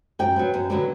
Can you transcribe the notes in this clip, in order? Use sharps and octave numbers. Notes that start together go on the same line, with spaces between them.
F#2 G5
F#3 B3
F#2
D3 F#3 B3 D4